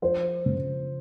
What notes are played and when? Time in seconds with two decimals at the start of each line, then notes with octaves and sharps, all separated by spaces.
0.02 F3 C5
0.46 C#3